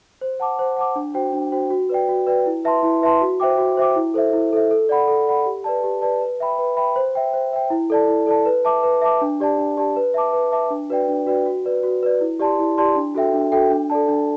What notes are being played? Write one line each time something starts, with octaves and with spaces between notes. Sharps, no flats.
C5
F#5 A5 D6
C5
F#5 A5 D6
D4
F#4 C5 G5
D4
F#4 C5 G5
F#4
B4 D5 G5
F#4
B4 D5 G5
E4
B4 E5 A5 C6
E4
B4 E5 A5 C6
F#4
C5 E5 G5 D6
F#4
C5 E5 G5 D6
E4
A4 C5 E5
E4
A4 C5 E5
A4
D5 F#5 B5
A4
D5 F#5 B5
G4
B4 D5 A5
G4
B4 D5 A5
B4
E5 G5 B5
B4
E5 G5 B5
C5
E5 G5
C5
E5 G5
E4
A4 D5 A5
E4
A4 D5 A5
B4
E5 A5 D6
B4
E5 A5 D6
D4
G4 D5 A5
D4
G4 D5 A5
B4
E5 A5 D6
B4
E5 A5 D6
D4
F#4 B4 D5 G5
D4
F#4 B4 D5 G5
F#4
B4 D5
F#4
B4 D5
E4
G4 D5 A5 C6
E4
G4 D5 A5 C6
D4
F#4 A4 E5 G5
D4
F#4 A4 E5 G5
D4
A4 D5 A5
D4